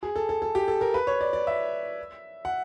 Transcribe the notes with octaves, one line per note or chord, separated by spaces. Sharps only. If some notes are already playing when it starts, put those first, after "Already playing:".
G#4
A4
A4
A4
G4
A4
A#4
B4
C#5
D5
D5
E5
F#5